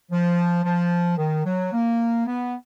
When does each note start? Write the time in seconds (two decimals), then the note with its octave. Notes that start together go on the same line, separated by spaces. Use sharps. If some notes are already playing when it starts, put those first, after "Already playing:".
0.11 F3
0.64 F3
1.18 D#3
1.45 F#3
1.73 A#3
2.27 B3